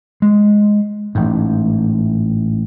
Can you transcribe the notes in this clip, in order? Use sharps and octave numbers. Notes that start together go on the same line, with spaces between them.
G#3
A1 G#2